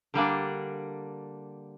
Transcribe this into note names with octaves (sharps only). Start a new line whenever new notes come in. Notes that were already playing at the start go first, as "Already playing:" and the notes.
D3 G3 A#3 D4